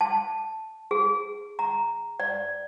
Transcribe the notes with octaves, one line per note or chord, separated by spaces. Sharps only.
A5
G#4
A#5
D5